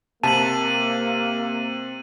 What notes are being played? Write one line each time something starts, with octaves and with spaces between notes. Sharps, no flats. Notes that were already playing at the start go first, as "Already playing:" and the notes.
C3 A#3 A5 D#7 F#7